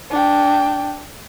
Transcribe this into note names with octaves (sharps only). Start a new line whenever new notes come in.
D4 G5